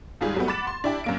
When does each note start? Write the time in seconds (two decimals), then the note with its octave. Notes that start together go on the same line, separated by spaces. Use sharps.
0.21 D#2 G#2 G3 F4 G#4
0.36 F#3 G3 A3 B3
0.48 F#5 B5 D6 A6 E7
0.67 C6
0.84 D4 E4 G4 D5
1.04 F#2 A#3 D7